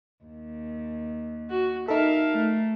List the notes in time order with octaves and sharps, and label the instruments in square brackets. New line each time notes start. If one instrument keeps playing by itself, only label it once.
[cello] D#2
[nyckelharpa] F#4
[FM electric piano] D#4 A4 [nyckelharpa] A#4 F5 [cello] E5
[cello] A3